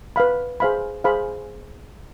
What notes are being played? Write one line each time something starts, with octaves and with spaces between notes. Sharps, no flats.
B4 F5 B5
G#4 C5 F5 B5
G#4 C5 F5 B5